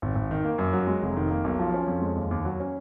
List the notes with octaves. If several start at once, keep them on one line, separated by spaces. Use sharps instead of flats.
G#1
G#1
D#3
A#3
F#2
F#3
G#3
F1
D#3
A#3
B1
F3
C#4
F2
G#3
D#2
D#2
F#3
C#4